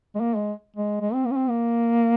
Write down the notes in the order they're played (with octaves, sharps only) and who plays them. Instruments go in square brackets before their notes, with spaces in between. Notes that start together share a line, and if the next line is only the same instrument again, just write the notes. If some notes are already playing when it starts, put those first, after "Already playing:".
[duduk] G#3
A#3
G#3
G#3
G#3
C4
A#3
C#4
C4
A#3